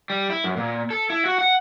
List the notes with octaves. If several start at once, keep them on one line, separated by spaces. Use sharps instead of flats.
G3
E4
F#2
A#2
A4
E4
F#4
F#5